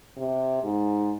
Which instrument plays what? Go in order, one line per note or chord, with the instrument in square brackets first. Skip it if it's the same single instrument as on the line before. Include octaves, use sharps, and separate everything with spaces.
[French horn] C3
G#2